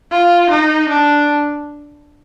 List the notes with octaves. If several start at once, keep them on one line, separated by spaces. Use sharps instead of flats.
F4
D#4
D4